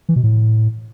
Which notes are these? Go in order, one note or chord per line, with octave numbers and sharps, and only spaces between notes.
E3
B2
A2